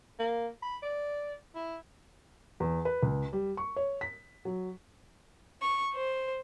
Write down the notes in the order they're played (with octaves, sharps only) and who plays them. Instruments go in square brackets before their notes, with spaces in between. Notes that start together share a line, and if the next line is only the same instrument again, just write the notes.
[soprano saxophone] A#3
B5
D5
E4
[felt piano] E2
B4
C#2
G3
C#6
C#5
B6
F#3
[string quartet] C#6
C5